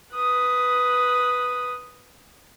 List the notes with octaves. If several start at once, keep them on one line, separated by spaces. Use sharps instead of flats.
B4 D#6